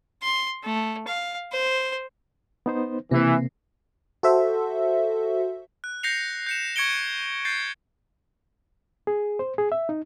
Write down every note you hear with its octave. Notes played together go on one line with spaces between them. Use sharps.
C6
A3
F5
C5
B3 D#4 C5
C3 E3 A#3 C4
F#4 A4 C5 E5
F#6
G6 A#6 C7 C#7 F7
G6 C#7 E7
C#6 G#6 C#7 D7 G7
G6 A6 C7
G#4
C5
G#4
E5
D#4